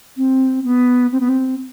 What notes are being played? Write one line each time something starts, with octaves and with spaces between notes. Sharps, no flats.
C4
B3
C4
B3
C4